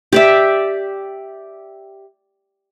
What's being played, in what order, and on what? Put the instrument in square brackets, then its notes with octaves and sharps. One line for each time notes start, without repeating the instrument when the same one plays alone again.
[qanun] G4 D5 E5